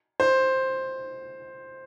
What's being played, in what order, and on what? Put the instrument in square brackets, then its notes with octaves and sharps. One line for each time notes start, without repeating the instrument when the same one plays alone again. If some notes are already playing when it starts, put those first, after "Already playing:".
[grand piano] C5